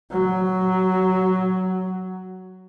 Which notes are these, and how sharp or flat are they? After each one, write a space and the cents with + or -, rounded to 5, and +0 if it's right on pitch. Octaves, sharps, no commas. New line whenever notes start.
F#3 +5